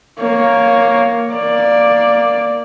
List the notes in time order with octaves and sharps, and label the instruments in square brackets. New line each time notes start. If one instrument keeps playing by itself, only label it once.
[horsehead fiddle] A#3 C#5
A#3 D5